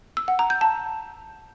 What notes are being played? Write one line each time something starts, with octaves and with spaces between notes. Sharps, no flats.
E6
F#5
A#5
G6
A5